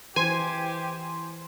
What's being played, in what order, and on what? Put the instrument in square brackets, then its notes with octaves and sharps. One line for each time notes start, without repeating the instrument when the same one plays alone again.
[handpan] E3 [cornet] G4 [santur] C5 [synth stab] G#5